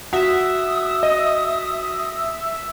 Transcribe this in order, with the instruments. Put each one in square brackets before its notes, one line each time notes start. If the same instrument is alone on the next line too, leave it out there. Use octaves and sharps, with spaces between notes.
[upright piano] F#4 [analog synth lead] E5 [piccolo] D#6
[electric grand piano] D#5